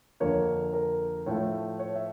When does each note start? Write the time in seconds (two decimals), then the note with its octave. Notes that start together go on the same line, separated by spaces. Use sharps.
0.20 F2 D3 F3 A#3 C#5
0.74 A#4
1.26 A2 F3 A3 C#5
1.79 C#5
1.96 E5